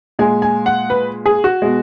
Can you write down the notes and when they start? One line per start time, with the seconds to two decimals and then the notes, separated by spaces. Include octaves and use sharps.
0.19 A#2 G#3 G#5
0.42 G#5
0.66 F#5
0.90 B4
1.26 G#4
1.44 F#4
1.62 B2 G#3